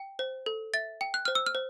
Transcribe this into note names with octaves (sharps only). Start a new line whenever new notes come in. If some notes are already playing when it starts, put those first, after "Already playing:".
Already playing: G5
C5
A4
E5 A6
G5
F#6
C5 F6
E6
F6
C5